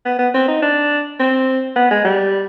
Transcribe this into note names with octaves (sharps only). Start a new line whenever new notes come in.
B3
B3
C4
D#4
D4
C4
B3
G#3
G3